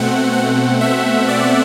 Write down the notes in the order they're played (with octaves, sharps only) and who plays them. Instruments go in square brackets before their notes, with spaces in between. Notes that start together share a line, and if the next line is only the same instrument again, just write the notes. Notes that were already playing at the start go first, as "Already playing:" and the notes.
Already playing: [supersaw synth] B2 A3 C4 F#5
F#5
E5
D5